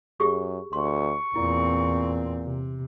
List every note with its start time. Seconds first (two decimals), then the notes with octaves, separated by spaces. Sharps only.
0.20 F#2 G4 G#4 C#6
0.73 D2 C6 C#6
1.36 E2 A#2 C4 E4
2.43 C3